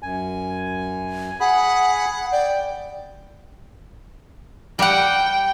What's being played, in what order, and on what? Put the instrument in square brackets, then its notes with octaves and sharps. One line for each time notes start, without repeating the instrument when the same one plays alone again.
[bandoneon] F#2 G#5
[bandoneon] G#4 B5 [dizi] F#5
[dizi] D5 [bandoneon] G5
[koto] G3 F#5 [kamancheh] G5